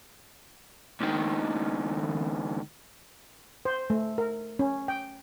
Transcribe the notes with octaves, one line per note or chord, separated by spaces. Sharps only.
C#2 D#3
C5
A3
A#4
C#4
G5